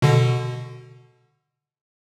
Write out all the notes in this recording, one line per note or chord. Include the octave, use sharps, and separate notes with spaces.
B2 D3